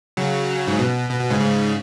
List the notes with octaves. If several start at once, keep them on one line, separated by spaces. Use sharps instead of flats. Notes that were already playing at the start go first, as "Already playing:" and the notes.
C#3 F#3
G#2
B2
B2
B2
G#2 C#3
G#2 C#3